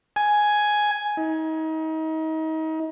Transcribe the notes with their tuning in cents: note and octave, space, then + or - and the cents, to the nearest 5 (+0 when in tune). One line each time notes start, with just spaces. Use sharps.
G#5 +5
D#4 +35